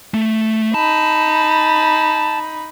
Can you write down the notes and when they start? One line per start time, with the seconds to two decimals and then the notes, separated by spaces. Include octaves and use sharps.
0.14 A3
0.74 D#4 A5 B5